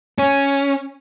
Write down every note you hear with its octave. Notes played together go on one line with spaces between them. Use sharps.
C#4